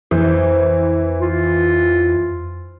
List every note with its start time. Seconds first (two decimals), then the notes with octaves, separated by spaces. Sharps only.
0.11 F2 E3 C5
1.21 F4